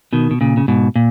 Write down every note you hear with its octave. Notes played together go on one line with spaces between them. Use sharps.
B2 D#3
B2
A#2 C#3
C#3
G#2 B2
A#2